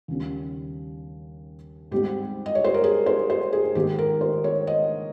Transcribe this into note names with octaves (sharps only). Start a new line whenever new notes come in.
D#2 C#3 G3 C#4
G#2 G3 C4 G4
D#5
C#5
C5
A#4
G#4
C5
C5
G#4
G#2 D#3 A#3 G4
A#4
C5
C#5
D#5